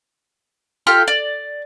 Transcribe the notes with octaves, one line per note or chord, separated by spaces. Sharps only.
F4 G4 A4 F6
D5